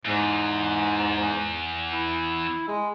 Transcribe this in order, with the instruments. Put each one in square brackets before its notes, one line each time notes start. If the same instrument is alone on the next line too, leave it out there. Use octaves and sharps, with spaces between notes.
[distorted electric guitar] E2 [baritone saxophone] G#2
[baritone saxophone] E4
G#3